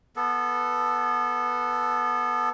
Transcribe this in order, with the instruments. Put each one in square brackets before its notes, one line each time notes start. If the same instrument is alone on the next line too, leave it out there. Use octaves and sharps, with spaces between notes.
[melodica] B3 A4